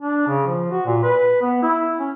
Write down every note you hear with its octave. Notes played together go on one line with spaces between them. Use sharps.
D4
C#3
F3
F#4
A#2
B4
B3
E4
C#4